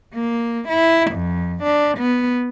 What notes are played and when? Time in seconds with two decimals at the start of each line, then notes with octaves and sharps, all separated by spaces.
0.14 A#3
0.69 E4
1.12 F2
1.64 D4
1.98 B3